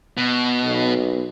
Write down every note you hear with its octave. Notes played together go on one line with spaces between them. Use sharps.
B2
B1